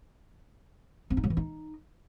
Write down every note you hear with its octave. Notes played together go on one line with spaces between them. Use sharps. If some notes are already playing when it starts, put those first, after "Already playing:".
C4
D#4
F#3
E3
D#4